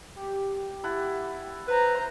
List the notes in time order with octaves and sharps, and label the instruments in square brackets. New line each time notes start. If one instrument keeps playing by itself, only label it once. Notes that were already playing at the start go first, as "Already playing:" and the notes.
[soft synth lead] G4
[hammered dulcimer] E4 F#5 A5
[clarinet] B4 [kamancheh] C5 A#5